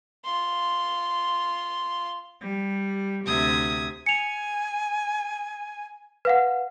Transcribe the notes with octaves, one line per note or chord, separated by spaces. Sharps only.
F4 C6
G3
D2 C3 E5 D#6 G#6
G#5 C#7 F7
B4 F5 F#5